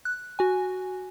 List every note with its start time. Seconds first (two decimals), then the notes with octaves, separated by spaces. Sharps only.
0.05 F#6
0.39 F#4 G#5